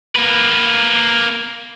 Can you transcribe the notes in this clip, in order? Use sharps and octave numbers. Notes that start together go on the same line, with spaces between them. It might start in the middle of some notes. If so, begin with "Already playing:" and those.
A#3 B4